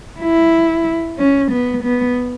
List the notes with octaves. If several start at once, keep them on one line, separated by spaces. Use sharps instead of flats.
E4
C#4
B3
B3